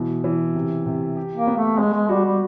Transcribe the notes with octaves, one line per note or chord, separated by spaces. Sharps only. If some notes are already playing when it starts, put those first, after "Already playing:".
Already playing: B2 E3
E3
C3
C3
G4
A#3
B3
A3
G#3 B3
G#3
G3 F#4
G3